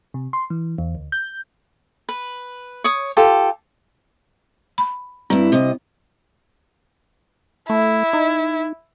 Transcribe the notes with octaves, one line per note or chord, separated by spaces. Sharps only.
C3
C6
E3
E2
D2
G6
B4
C#5 D#6
F4 G4 A4
B5
G2 C4 E4
C3 D#5
A3 E4
D#4